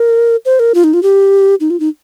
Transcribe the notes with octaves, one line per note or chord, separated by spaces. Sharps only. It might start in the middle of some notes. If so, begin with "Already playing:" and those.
Already playing: A#4
C5
A#4
F4
D#4
F4
G4
D#4
F4
D#4